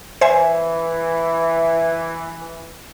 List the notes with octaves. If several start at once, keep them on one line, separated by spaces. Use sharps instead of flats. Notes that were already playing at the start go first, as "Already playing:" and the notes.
E3 C5 E5 G#5